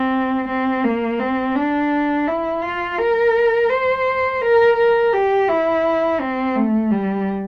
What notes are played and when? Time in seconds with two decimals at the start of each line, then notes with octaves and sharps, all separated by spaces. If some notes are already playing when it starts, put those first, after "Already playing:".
Already playing: C4
0.49 C4
0.84 A#3
1.19 C4
1.55 D4
2.28 E4
2.63 F4
2.99 A#4
3.69 C5
4.41 A#4
4.77 A#4
5.13 G4
5.48 E4
6.20 C4
6.55 A3
6.91 G3